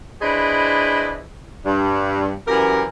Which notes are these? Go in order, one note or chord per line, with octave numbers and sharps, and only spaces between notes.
D4 E4 G#4 B4 C5 D#5
G2
F#2 E3 G4 A#4